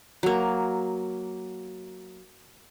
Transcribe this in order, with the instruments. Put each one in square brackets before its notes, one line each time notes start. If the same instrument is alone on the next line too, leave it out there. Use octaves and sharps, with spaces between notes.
[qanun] F#3 A#3